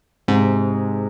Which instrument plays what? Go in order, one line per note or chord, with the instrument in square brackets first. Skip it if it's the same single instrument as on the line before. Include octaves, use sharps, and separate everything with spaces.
[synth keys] G#2 [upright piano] C3